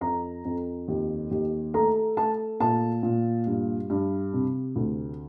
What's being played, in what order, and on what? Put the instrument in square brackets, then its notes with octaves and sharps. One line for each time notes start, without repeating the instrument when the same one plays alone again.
[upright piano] F2 A#5
F2
D#2
D#2
A3 A#5
A3 A5
A#2 A5
A#2
G2
G2
C3
D2